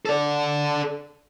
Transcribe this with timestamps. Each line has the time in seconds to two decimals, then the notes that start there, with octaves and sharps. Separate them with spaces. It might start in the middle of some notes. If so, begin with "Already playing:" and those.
0.05 A4 D5